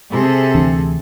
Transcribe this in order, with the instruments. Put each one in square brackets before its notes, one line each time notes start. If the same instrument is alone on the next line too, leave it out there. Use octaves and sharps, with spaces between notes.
[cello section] C3 G#4 A4
[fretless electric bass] D2 E3 D4